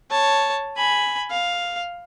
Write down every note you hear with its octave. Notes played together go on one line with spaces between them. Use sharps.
C#5 A5
G#5 B5
F5